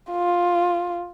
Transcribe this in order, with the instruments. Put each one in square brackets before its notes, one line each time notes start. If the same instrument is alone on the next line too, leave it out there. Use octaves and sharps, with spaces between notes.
[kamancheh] F4